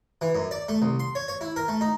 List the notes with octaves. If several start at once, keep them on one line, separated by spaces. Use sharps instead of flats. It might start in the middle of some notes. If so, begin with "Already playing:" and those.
E3
F#2
D5
A3
C2
C6
C#5
C#5
E4
A#4
A3
D#4